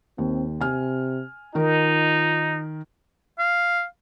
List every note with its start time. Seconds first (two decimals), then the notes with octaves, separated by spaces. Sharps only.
0.18 D#2 C4
0.61 C3 G#5 F6
1.55 D#3 D#4 F4 A#4
3.39 F5